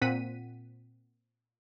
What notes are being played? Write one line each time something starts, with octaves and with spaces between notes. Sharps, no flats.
A#2 C4 F#5 B6 D#7